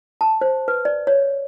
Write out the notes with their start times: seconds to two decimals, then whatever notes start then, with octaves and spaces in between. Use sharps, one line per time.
0.21 A5
0.41 C5
0.68 B4
0.85 D5
1.07 C#5